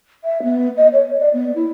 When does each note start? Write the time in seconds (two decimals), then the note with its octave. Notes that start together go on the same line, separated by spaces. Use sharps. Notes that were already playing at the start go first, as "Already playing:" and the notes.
0.24 E5
0.42 B3
0.77 D#5
0.92 C#5
1.19 D5
1.33 B3
1.55 E4